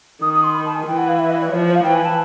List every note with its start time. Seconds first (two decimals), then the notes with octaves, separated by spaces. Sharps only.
0.22 D#3 D#6
0.33 D#6
0.44 C6
0.54 B5
0.65 A5
0.75 G#5
0.87 E3 G5
0.98 F#5
1.08 F5
1.19 E5
1.30 D#5
1.41 D5
1.51 F3 C#5
1.68 C5
1.75 F5
1.84 E3 G5
1.94 G#5
2.05 A5